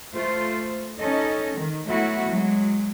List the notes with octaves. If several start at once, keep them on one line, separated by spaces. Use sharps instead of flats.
A3 F4 C5
C#4 D#4 A4 D#5
D#3
F#3 A3 B3 E4 F#4
F#3 G#3